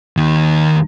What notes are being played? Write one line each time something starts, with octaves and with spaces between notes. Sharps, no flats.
D#2 D#3